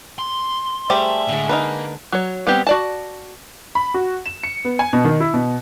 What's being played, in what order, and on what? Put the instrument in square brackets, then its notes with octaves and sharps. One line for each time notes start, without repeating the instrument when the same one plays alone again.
[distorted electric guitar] C6
[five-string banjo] G3 G4 C5 [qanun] A3 G#4 [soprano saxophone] E5
[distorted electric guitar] A2 [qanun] D3 G#3
[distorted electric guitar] A#3 [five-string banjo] D#4 A#4 B4
[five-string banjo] F#3 C#5
G3 B3 C4 G4
F#4 D5 A5
[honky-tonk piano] B5
F#4
E7
C#7
B3
G#5
B2
D#3
E4
B2